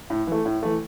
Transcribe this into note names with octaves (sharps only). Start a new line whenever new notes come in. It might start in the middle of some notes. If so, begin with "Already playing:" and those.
A2
E3 A3
A2
E3 A3